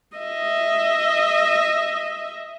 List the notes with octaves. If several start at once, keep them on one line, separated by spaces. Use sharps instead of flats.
D#5 E5